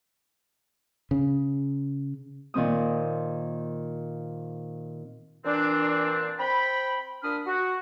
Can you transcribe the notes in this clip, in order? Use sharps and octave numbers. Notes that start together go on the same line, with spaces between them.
C#3
A#2 D#3 C4 D#6
A#2 E3 C4 D4
C4 G5 B5
A#2 D4 B5 D#6 F6
F#4